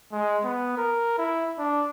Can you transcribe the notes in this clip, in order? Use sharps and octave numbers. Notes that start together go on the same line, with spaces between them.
G#3
B3
A#4
E4
D4